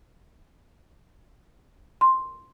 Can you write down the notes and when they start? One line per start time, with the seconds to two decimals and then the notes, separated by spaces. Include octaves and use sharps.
2.01 C6